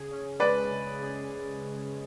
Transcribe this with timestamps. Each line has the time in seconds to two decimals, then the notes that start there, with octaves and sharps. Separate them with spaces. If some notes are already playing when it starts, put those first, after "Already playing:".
Already playing: C#3 G#4
0.10 C#4
0.40 G#3 B4 D5
0.70 C#3
1.01 G#4